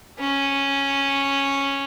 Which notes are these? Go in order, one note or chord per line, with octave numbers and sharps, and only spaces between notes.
C#4